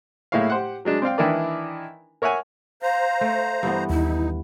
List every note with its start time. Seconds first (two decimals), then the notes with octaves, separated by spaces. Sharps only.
0.32 A2 G#3 A#3 E4 C#5 F5
0.50 G4 C5 F#5
0.85 F#3 G#3 D4
1.02 C4 D5 F5 G5
1.18 D#3 E3 D4 E4 A#4 D5
2.22 A#4 C#5 E5 F#5 G#5
2.82 C5 F5 A#5
3.21 A3
3.63 G2 E3 B3
3.90 D#2 D#4 E4